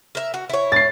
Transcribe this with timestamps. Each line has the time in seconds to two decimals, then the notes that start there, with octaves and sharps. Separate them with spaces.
0.15 A#4 E5
0.34 F#4
0.50 E4 C#5
0.72 A6 C7